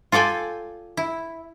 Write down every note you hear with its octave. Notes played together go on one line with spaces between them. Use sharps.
F4 A4 D5 G5 G#5
E4